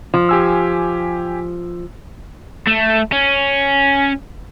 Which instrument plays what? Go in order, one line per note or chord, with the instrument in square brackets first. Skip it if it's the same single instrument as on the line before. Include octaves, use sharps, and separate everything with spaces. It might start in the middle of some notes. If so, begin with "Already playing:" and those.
[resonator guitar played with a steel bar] F3
[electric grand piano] G4 G#5 E6
[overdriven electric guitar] A3
C#4